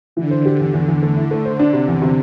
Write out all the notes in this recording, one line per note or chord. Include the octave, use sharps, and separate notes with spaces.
D3 E3
C5
G4
E2
E2
E2
D3 A3
E4
A3
C5
D4
C3
E2
C3